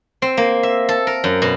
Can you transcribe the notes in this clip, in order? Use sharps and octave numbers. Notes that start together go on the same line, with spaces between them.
C4
A#3
E5
A4
A#4
F#2
B2